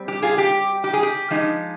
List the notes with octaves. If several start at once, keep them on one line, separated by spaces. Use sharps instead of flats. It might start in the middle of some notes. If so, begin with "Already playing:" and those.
Already playing: G3 C4
G4
F4 G#4
G4
G4
G#4
G4
F3 G#3 D#4